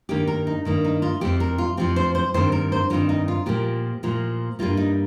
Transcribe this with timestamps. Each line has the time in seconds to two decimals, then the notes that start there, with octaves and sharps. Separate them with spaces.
0.09 G2 D#3 A#3 G4
0.27 A#4
0.47 D#4
0.65 G2 D#3 A#3
0.85 D#4
1.02 F4
1.21 F2 F3 C4 G4
1.40 A#4
1.58 F4
1.77 F2 F3 C4 G4
1.96 C5
2.15 C5
2.34 G2 D#3 C4 C5
2.52 A#4
2.72 C5
2.90 G2 D#3 C4 F4
3.09 D#4
3.28 F4
3.46 A#2 F3 A#3 G4
4.03 A#2 F3 A#3
4.59 G2 G3 A#3 F4
4.77 D#4